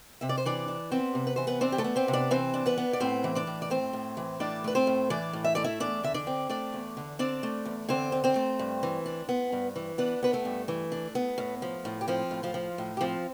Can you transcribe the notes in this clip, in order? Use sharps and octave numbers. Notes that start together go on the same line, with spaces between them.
C3 E5
D5
C5
E3 D4 D5
D4
B3 C4 C5
C3
B4
E3 C5
B3 B4
C4 D4 C5
G4
A3 A4
B3
C4 C5
C3
D4 D5
E3 C4 C5
D4
B3 B4
B3
D5
A2 C4 C5
E3
D4 D5
A2
D5
A3 C4 C5
A2
E3
A2 D4 D5
A3 B4
C4 C5
A2
E3 D4 D5
A2
E5
A3 D5
E4 E5
E2 D4 D5
D3 E5
D4 D5
C4
A3 D4 D5
E2
D3
C4 D4 D5
A3
E2
D3 C4 C5
C4
C4 C5
A3
G2
E3
D4
B3
G2
E3
B3 D4 B4
B3 B4
A3 A4
G2
E3
D4
B3
A2
F3
A2
G4
F3 C4 F4
A2
F3 F4
F3
A2
G4
F3 C4 F4